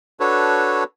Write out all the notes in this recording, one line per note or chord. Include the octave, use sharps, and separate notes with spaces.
D4 F#4 A4 B4 C#5